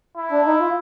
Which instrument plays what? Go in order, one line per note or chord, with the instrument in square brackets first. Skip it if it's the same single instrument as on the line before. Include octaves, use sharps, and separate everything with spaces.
[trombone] E4
[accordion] D4
D#4
F4